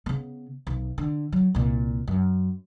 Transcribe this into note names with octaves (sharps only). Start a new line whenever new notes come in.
C#3 B3
B1
D3
F#3
C2 A#2
F#2